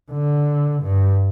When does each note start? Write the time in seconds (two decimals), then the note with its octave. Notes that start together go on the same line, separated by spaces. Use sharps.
0.11 D3
0.83 G2